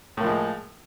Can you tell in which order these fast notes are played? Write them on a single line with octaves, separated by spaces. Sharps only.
A2 A#3 F3 G#3